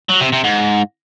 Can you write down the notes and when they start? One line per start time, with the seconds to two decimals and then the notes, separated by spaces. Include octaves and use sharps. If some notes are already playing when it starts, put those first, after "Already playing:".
0.10 F#3
0.21 C3
0.33 C3
0.44 G#2